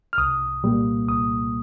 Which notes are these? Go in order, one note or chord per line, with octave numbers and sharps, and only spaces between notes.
F6
C2 D#6
A#2 G3 A#3
C2 D#6